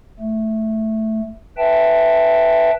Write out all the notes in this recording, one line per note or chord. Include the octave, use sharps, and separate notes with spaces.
A3
B4 E5 G5 A5